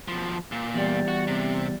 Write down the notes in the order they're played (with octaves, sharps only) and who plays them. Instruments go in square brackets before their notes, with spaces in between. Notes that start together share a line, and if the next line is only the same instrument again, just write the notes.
[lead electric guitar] B2 F3
A#2
[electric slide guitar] E2 G3
[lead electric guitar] F#4
C3